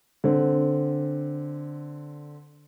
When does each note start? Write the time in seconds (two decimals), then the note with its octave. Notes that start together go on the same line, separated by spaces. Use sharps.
0.24 D3 C4